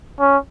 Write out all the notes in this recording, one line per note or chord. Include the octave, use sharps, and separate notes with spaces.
C#4